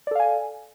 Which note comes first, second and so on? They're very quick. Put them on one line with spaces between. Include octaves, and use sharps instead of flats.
D5 A4 F5 G#5